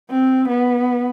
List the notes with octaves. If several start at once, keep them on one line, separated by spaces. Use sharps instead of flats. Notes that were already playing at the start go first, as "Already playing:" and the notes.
C4
B3